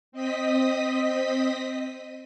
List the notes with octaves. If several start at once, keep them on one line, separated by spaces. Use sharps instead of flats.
C4 D#5 D#6 B6